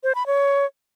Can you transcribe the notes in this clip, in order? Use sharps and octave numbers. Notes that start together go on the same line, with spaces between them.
C5
B5
C#5